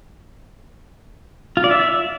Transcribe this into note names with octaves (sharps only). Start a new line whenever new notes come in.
F4
D5
E5